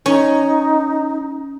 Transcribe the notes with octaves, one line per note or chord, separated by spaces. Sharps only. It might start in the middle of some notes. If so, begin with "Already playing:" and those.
C#4 D#4